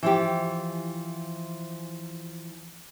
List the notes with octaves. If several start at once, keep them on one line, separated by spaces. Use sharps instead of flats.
E3 F3 G4